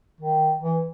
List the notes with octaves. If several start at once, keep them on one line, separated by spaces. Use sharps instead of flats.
D#3
E3